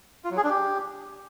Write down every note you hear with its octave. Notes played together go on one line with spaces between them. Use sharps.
F4
F#3
G#4
D4
G4